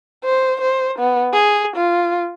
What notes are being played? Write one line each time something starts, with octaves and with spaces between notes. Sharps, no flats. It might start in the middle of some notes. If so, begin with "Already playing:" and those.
C5
C5
B3
G#4
F4